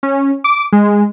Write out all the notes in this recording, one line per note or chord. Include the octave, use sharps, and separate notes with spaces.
C#4
D6
G#3